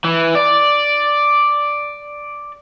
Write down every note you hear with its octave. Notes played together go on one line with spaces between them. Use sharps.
E3
D5